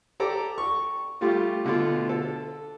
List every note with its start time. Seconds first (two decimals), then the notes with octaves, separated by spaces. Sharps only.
0.20 G4 A4 D5 A#5 D6
0.58 C#6
1.21 G3 A3 F4 G4
1.65 B2 D3 A3 D4 F4
2.09 A4